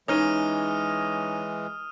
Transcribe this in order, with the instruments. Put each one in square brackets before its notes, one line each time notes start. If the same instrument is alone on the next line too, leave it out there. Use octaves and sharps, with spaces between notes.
[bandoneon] E3 G#3 [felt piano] C#4 D#4 [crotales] D#6 F6 D#7